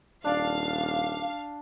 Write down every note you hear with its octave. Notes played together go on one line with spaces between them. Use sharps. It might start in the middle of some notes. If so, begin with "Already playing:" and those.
D#1 D4 D5 F5